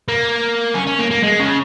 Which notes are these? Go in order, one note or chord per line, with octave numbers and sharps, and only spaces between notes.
A#3
C#4
C#4
A#3
A#3
G#3
C#3